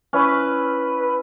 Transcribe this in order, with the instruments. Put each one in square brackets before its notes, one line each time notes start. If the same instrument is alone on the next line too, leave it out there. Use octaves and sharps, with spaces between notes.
[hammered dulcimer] C#4 E4 [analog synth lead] B4